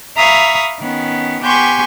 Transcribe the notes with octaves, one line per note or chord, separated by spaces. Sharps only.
E5 F5 A#5 B5 C#6 D#6
D#3 B3 C#4
B3 G4 G#5 C6 C#6 G6